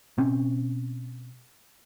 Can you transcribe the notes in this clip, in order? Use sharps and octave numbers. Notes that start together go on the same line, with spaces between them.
B2 C4 C#4